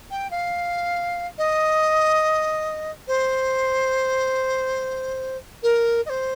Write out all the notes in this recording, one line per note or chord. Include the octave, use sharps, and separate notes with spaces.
G5
F5
D#5
C5
A#4
D#5
C5